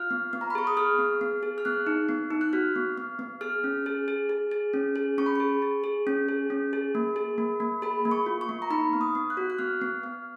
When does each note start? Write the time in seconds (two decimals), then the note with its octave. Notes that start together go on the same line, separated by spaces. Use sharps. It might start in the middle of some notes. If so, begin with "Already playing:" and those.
Already playing: F4 F6
0.11 B3
0.33 B3
0.41 A#5
0.50 B5
0.55 G#4 C#6
0.67 D#6
0.77 G#4 F6
0.99 B3
1.21 B3
1.43 G#4
1.58 F6
1.65 B3 F#6
1.87 D#4
2.09 B3
2.31 D#4
2.41 F#6
2.53 F#4 F6
2.76 B3
2.98 B3
3.19 B3
3.41 G#4 F6
3.64 C#4
3.86 G#4
4.08 G#4
4.29 G#4
4.51 G#4
4.73 C#4
4.96 G#4
5.18 C#4 C#6
5.26 B5
5.35 G#4 C#6
5.62 G#4
5.84 G#4
6.07 C#4
6.28 G#4
6.50 C#4
6.73 G#4
6.95 A#3
7.16 G#4
7.38 A#3
7.60 A#3
7.82 G#4 B5
8.05 A#3
8.11 C#6
8.26 F4
8.41 C#6
8.49 A#3
8.62 A#5
8.70 D#4 B5
8.93 B3
9.01 D#6
9.15 B3
9.30 F#6
9.37 F#4
9.50 F#6
9.58 B3 F6
9.82 B3
10.03 B3